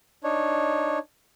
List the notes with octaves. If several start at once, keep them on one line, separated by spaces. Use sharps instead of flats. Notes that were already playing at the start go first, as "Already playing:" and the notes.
D4 D#4 C#5